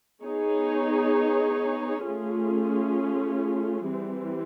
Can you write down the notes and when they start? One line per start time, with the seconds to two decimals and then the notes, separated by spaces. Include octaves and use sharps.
0.23 B3 D#4 G#4 C#5
2.06 A3 C#4 F4 G#4
3.88 E3 G3 C4